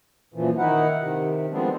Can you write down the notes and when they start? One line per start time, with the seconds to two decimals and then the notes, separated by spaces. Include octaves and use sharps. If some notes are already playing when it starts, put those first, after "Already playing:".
0.34 F#2 A#2 E3 F3
0.58 D#3 D#4 E4 F#5
1.00 C3 D#3
1.52 F3 G3 G#3 B3 C4 D4